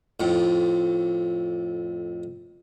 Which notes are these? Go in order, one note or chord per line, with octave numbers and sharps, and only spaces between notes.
F2 A2